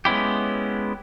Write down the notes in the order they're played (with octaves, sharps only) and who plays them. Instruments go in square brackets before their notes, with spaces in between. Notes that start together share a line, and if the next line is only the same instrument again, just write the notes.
[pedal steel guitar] G#3 B3 C#4 E4 G4